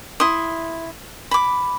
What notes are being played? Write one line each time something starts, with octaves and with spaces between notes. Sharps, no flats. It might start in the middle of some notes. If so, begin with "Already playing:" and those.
E4 C6 D#6
B5 D6